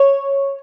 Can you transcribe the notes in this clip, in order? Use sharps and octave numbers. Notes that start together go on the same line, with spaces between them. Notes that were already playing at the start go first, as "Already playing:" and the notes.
Already playing: C#5